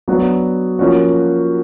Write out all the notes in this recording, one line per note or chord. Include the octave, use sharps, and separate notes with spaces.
F#3 B3 D4 F#4
F3 A#3 C#4 F#4